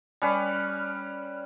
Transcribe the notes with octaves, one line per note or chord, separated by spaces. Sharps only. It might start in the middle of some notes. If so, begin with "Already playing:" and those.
G3 C#4 B4